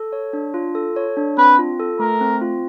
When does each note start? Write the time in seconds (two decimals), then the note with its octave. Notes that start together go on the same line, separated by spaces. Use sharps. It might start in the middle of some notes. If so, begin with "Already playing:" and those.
Already playing: A4
0.13 C#5
0.33 D4
0.54 F4
0.75 A4
0.96 C#5
1.17 D4
1.37 C4 B4
1.58 F4
1.80 A4
1.99 A3 A#4
2.21 C4
2.41 F4